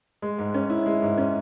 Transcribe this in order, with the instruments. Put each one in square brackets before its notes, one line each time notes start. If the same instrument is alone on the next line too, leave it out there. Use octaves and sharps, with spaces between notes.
[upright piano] G#3
G#2
C#4
E4
G#3
G#2
C#4